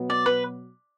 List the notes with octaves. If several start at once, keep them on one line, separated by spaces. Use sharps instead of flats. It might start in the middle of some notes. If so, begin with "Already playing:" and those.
Already playing: B2 F#3 B3
D5
B4